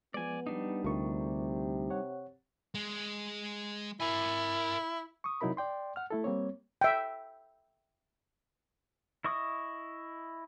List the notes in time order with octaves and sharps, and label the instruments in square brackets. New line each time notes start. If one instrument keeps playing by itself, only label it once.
[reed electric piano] F3 G#3 [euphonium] B3 [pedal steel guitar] D5 G#5
[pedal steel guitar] G3 D4 D#4
[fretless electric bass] D2 [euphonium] C3 [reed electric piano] F4 A#4 C#6
[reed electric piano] C#5 F#5
[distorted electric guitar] G#3
[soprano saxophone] E4 [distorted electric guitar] A#4 G#5
[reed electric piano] C#6 D#6
C3 F#3 D#4 E4 A#4 B5
D5 G5 C6
F#5 F6
A3 E4 A4
G3 A#3 C4 C#5
[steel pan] E5 G5
[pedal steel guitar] E4 D#5 C#6 D#6